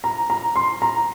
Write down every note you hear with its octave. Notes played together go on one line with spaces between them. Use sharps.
A#5
A#5
C6
A#5